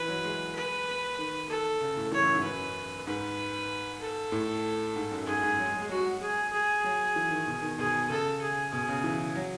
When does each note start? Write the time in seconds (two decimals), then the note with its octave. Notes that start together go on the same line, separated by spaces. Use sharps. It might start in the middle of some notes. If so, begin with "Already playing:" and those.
Already playing: E3 B4
0.08 F#3
0.25 G#3
0.55 B4
1.19 D#3
1.50 A4
1.81 C#3
1.97 A2
2.12 E3 C#5
2.22 F#2
2.34 G#2
2.43 F#2 B4
3.07 G#2 B4
4.01 A4
4.32 A2
4.96 G#2
5.11 F#2
5.26 G#2 G#4
5.43 G#2
5.58 F#3
5.66 G#3
5.74 F#3
5.82 G#3
5.89 F#3 F#4
5.98 G#3
6.05 F#3
6.21 G#3 G#4
6.52 G#4
6.84 F#3
7.16 E3
7.30 D#3
7.47 B2
7.62 D#3
7.78 B2 G#4
8.10 C#3 A4
8.41 G#4
8.73 B2 G#4
8.88 C#3
9.04 E3
9.35 F#3